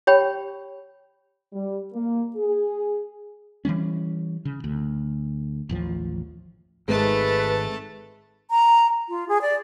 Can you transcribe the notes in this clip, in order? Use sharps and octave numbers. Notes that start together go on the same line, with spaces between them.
G4 C#5 G5 B5
G3
A#3
G#4
E3 F#3 G3 C#4
C#3
D2
A1 D#2 F3
G#1 G#2 D#3 G#3 A3 B4 A5
A#5
F4
G#4
D5